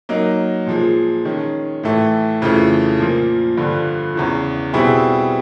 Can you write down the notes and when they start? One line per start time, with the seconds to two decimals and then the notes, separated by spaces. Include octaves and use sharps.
0.09 F#3 A#3 D#4
0.67 A#2 F3 G#3
1.25 D#3 G#3 C#4
1.84 A2 E3 A3
2.42 F2 C#3 E3 A3
2.99 A#2 F3 A#3
3.57 G2 D3 F3
4.15 E2 C#3 E3
4.73 B2 G3 C4 E4 G#4